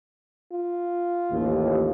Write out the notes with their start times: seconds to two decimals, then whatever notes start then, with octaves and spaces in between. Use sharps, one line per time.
0.52 F4
1.31 A1 D#2